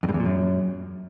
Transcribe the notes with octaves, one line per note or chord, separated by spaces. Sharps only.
F2
G2
E2
A#2
F#2